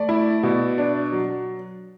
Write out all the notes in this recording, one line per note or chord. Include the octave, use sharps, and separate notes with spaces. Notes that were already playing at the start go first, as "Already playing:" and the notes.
Already playing: A3 D5
E4
B2
D4
F#3